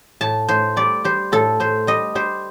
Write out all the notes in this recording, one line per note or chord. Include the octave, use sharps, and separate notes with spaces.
A2 A5
A2 C5
G3 D5
G3 C5
A2 A4
A2 C5
G3 D#5
G3 C5